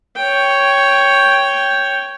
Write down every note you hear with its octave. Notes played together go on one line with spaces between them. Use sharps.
C#5 G5